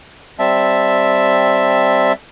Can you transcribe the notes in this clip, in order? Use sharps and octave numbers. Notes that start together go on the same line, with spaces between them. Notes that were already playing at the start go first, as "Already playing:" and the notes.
G3 C4 E5 A5